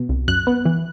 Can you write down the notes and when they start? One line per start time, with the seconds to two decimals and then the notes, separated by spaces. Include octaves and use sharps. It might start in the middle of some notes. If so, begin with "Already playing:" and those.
Already playing: B2
0.09 C2
0.28 F#2 F#6
0.47 B3
0.65 E3